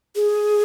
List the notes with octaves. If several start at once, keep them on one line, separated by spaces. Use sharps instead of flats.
G#4